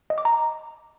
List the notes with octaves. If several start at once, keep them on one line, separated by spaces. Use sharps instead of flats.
D#5
D6
A#5